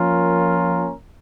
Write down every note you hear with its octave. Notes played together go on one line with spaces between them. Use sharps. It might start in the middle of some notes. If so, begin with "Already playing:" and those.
Already playing: F3 A#3 C#4 F4 A#4